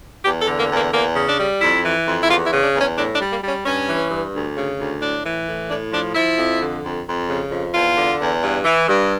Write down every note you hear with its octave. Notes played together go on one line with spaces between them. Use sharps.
E2 G4
A4
D3
A#3
E2
A#3
E2 A#3
C#3
D4
G3
F2 E4
E3
F2
E4
E2 F4
E4
C#3
D4
E2
C#4
A2 D4
D4
G3
A#3
G3
C#4
G2 C#4
E3
G2
D2
C#3
D2
A2 D4
E3
A2
A2 D4
F3 D4
F3 E4
F2
D3
F2
F2
C#3
F2
E2 F4
D3
E2
G2
E3
G2